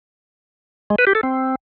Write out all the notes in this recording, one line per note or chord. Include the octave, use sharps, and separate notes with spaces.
G#3
B4
G4
A4
C4